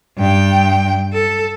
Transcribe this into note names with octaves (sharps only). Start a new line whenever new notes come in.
G2 G5
A4